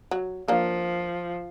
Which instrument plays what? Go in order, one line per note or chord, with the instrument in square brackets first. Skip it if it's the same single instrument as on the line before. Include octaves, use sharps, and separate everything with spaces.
[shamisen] F#3
[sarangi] F3 [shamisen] A#3 D4